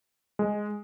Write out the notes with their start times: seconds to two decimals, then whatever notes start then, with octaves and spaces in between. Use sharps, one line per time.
0.39 G#3